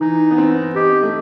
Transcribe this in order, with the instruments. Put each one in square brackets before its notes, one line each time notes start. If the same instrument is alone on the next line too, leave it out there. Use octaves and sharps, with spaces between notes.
[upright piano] E3 [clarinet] D#4
[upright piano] B3
C4
[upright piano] D#4 [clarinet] G4
[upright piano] A3